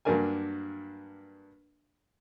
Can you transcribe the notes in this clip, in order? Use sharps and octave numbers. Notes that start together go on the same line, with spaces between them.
G2 F#3 A#3 D4 A#4 G#5